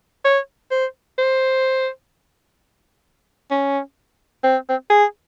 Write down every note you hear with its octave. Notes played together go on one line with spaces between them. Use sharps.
C#5
C5
C5
C#4
C4
C4
G#4